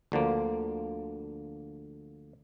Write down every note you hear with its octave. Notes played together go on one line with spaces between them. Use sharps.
D2 D3 F3 A#3